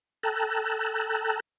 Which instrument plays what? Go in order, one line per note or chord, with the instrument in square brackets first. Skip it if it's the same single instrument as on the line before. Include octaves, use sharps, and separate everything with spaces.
[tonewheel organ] A4 G5 A5 A#5 E6 F#6